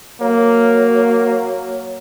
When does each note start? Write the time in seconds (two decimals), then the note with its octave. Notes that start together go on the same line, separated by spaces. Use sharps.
0.21 F#3 A#3